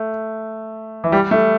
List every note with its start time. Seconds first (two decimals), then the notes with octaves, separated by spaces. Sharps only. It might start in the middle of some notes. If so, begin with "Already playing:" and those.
Already playing: A3
1.04 E3
1.12 G3
1.31 A3